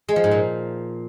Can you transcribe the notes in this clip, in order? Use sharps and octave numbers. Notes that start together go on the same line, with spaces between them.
G#3
F3
G#2
A#2